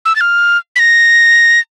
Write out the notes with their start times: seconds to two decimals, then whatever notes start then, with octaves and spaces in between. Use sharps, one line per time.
0.05 E6
0.16 A6
0.21 F6
0.76 B6
0.79 A#6